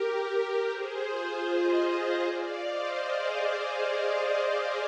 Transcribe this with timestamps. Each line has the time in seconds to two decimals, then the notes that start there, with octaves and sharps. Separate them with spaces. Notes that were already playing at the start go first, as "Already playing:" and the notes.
Already playing: G4 A#4
0.69 G#4 C5
1.08 F4 G#4
1.47 C5 D#5
2.25 D5 F5
2.64 C5 D#5
3.03 G#4 C5